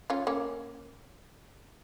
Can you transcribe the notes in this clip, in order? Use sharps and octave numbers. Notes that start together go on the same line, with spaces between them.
C#4 F4
A#3 C#4